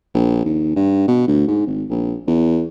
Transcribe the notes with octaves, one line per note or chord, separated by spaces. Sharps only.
A#1
D#2
G2
B2
D2
G#2
G#1
A#1
E2